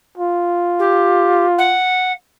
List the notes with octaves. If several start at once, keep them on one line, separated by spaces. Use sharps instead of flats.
F4
G4
F#5